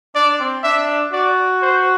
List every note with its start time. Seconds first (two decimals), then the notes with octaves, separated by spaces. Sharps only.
0.15 D4 D5
0.40 C4
0.63 D4 E5
1.13 F#4 D5
1.62 C5